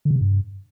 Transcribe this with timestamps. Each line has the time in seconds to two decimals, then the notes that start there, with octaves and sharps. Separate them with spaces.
0.05 D3
0.11 C#3
0.16 C3
0.21 G2